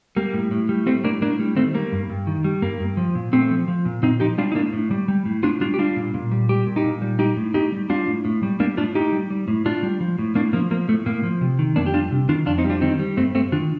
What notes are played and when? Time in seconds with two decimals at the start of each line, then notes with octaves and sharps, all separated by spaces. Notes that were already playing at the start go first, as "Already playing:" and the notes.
0.16 G3 A#3
0.34 A2
0.51 A2
0.69 G3
0.86 G3 A3 C4
1.04 A2 A#3 D4
1.22 A2 A#3 D4
1.39 G3
1.56 D#3 A3 C4
1.74 G3 A#3
1.92 G2
2.10 G2
2.27 D#3
2.44 G3
2.62 G2 A#3
2.80 G2
2.97 F3
3.15 A#2
3.32 A#2 A3 C4
3.51 F3
3.68 F3
3.85 A#2
4.03 A#2 C4 D#4
4.20 F3 D#4 G4
4.38 G3 D4 F4
4.52 D#4
4.55 A2 A#3 D4
4.73 A2
4.91 G3
5.08 G3
5.25 A2
5.43 A2 D4 F4
5.61 G3 D4 F4
5.74 G4
5.79 G3 D4 F4
5.96 A#2
6.14 A#2
6.31 G3
6.49 G3 G4
6.67 A#2
6.76 D#4 G4
6.84 A#2
7.02 G3
7.19 G3 D#4 G4
7.37 A2
7.54 A2 D#4 G4
7.72 G3
7.90 G3 D4 F4
8.07 A2
8.25 A2
8.43 G3
8.60 G3 A#3 D4
8.77 A2 D4 F4
8.95 A2 D#4 G4
9.12 G3
9.30 G3
9.48 A2
9.65 A2 D4 F4
9.83 G3
10.01 F3
10.19 A2
10.35 A2 A#3 D4
10.53 F3 A#3
10.71 F3 A#3
10.89 A2 A3
11.06 A2 A#3
11.24 F3
11.41 C3
11.59 D#3
11.76 F2 A#3 D4
11.86 G4
11.94 G3 D4 F4
12.11 C3
12.29 D#3 D4 F4
12.46 F2 D4 F4
12.58 C4 D#4
12.65 G3
12.70 D4 F4
12.81 D#3 C4 D#4
12.99 G3
13.17 G2 A3 C4
13.34 G2 A3 C4
13.52 D#3 D4 F4